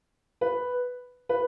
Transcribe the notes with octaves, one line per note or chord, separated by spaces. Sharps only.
B4
B4